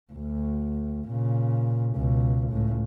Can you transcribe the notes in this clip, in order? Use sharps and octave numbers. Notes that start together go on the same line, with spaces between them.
D2
A#2 C#3
C#2 B2
C#2 A2